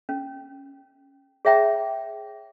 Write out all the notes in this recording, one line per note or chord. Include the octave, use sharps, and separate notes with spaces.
C#4
G#4 C#5 E5 G5 A#5